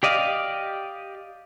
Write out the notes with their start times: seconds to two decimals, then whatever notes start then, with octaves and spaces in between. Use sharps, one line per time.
0.03 G4 D5 D#5 F5